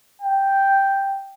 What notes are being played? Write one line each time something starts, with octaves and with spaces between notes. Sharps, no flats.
G5